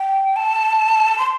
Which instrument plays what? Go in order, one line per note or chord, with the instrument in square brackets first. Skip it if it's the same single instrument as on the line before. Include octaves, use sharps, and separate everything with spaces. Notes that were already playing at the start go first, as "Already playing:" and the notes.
Already playing: [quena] G5
A5
C6